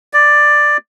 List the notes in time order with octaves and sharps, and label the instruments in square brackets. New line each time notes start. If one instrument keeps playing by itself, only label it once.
[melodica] D5